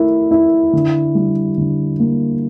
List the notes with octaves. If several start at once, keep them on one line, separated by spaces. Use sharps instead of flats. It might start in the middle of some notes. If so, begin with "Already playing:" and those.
Already playing: A3 E4 A#4
E4
D3
G3
D3
A#3